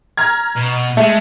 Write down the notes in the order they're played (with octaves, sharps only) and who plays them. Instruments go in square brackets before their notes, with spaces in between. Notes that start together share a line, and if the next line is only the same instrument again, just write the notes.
[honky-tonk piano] A#5 F6 G#6
[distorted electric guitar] B2
[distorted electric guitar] G#3 [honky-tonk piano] A3